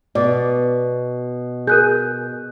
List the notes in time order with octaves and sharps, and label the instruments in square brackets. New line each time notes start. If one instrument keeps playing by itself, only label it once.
[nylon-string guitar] B2 [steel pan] D5
[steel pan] G#4 [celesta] A#4 F#6 G6